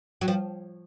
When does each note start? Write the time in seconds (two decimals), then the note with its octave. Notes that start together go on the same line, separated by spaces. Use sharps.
0.21 F#3
0.28 F3